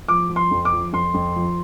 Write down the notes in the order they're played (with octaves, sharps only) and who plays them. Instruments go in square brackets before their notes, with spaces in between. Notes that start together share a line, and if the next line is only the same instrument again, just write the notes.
[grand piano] F3 D6
F3
C6
F2
D6
F3
F2 C6
F2
F3